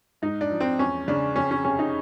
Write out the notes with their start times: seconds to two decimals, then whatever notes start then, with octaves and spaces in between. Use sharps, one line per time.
0.22 G#2 D#4
0.41 D4
0.51 F3
0.60 C4
0.79 E2 C#4
1.08 C#3 D4
1.36 F2 C#4
1.51 C#4
1.65 C3 C#4
1.79 D#4